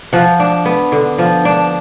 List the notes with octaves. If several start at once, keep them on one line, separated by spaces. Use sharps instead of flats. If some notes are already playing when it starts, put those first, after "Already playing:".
F3 F#5
D4
B3
D3
F3
D4